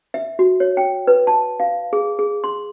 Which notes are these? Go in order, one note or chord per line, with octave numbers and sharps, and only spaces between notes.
E5
F#4
C#5
G5
B4
A5
F5
G#4
G#4
C6